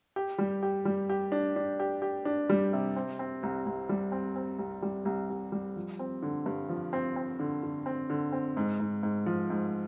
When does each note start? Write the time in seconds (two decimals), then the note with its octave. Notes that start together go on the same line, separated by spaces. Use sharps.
0.16 G4
0.38 G3
0.63 G4
0.85 G3
1.10 G4
1.32 D4
1.56 D4
1.80 G4
2.02 G4
2.25 D4
2.49 G3
2.73 C3
2.96 C4
3.19 C4
3.43 C2
3.66 C2
3.89 G3
4.12 C4
4.36 C4
4.59 C2
4.82 G3
5.05 C2
5.30 C2
5.52 G3
5.76 F3
5.99 C4
6.23 D3
6.46 G2
6.69 F3
6.93 C4
7.16 C4
7.39 D3
7.63 D3
7.86 C4
8.10 D3
8.32 C4
8.57 G#2
8.80 G#2
9.03 G#2
9.26 F3
9.50 G#2